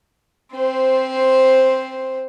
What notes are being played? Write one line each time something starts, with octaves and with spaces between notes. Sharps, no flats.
C4 C5